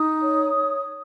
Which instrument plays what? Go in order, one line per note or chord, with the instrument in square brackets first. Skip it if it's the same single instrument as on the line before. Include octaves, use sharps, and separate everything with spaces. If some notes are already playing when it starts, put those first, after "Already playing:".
Already playing: [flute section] D#4 D#6
C#5